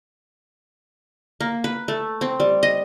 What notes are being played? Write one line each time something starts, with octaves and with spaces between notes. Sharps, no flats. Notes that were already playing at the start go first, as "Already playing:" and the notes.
A#3
B4
A3
C4
G3
D#5